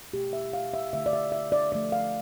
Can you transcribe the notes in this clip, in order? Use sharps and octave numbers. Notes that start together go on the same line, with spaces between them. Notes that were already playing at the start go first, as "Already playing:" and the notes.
B2 A3 G4
E5
F5
E5
D3 A3 E5
D5
E5
E5
D5
D3 F3 A3 D5
F5